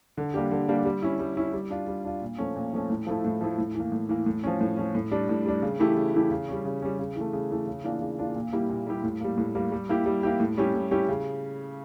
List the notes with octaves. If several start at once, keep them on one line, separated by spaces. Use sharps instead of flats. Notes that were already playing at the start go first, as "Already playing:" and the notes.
D3
G3 A#3 D4 G4
D3
G3 A#3 D4 G4
G3
C#4 E4
G3
C#4 E4
G3
D4 F4
G3
D4 F4
A#2
F3 A3 C#4
A#2
F3 A3 C#4
A2
F3 A3 E4
A2
F3 A3 E4
A2
E3 A#3
A2
E3 A#3
A2
F3 C#4
A2
F3 C#4
A2
G3 D4
A2
G3 D4
C#3
E3 A3 E4 G4
C#3
E3 A3 E4 G4
C#3
G3 C#4
C#3
G3 C#4
C#3
E3 A3
C#3
E3 A3
C#3
E3 A#3 D4 F4
C#3
E3 A#3 D4 F4
A#2
G3 A#3 E4 G4
A#2
G3 A#3 E4 G4
A2
G3 A#3
A2
G3 A#3
G3
A#3 E4 G4
G3
A#3 E4 G4
A2
G3 C#4 E4 G4
A2
G3 C#4 E4 G4
C#3